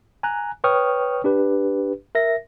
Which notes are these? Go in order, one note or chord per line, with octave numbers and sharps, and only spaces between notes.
G#5 A#5 F#6
B4 C#5 G5 C#6 D#6 F6
D4 G4 B4
A#4 E5 A#6